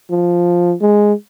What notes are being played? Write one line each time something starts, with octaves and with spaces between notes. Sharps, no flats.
F3
G#3